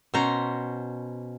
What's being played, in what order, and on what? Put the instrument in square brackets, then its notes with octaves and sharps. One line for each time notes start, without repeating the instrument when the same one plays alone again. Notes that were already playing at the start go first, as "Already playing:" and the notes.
[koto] B2 C#4 C5 A#5